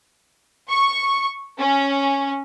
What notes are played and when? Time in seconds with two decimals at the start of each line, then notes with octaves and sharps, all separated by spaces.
0.69 C#6
1.59 C#4